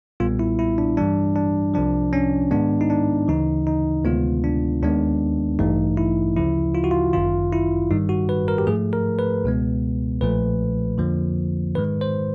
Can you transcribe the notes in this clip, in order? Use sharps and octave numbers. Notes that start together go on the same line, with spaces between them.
B1 A#2 G3 B3 F4
E4
E4
D4
G2 E3 G3 D4
D4
C2 C3 F3 D4
C#4
G#2 D#3 G#3 B3 D4
D#4
D4
D2 C#3 E3 D#4
D#4
D2 C3 D#3 G#3 B3 F4
D4
D#2 D#3 G#3 B3 D4
A1 G2 E3 A3 D#4
E4
D2 C#3 F3 E4
F4
F#4
F4
G1 F#2 D#3 F4
E4
G2 D#3 G3 D#4
F#4
B4
A#4
G4
G#2 F3 A3 G#4
A#4
B4
C#2 B2 G#3 B3
B1 A#2 F3 A3 B4
F2 D3 F3 A#3
G#2 D#3 G#3 B4
C5